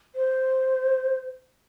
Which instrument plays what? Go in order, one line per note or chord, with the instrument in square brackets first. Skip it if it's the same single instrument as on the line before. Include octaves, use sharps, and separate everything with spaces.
[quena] C5